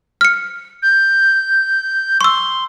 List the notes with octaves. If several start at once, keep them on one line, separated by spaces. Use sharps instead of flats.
F6 C#7
G6
C6 C#6 E6